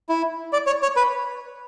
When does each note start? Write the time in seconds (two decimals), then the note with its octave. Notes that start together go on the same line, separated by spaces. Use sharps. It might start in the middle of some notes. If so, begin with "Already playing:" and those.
0.09 E4
0.53 D5
0.66 C#5
0.82 C#5
0.96 B4